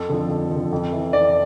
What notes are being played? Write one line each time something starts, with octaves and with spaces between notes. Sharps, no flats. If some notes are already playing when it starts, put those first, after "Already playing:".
Already playing: F2 A4
D3 F3
F2
F3
D3
F2
E3
F2 D5